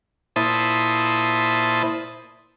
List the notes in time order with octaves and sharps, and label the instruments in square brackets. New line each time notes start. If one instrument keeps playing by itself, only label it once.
[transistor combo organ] A#2 E4 C5 A5 B5 D#6